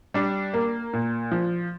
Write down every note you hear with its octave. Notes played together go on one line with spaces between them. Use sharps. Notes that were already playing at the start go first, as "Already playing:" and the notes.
G3 D4
A#3
A#2
F3